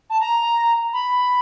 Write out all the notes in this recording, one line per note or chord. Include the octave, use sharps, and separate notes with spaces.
A5
A#5
B5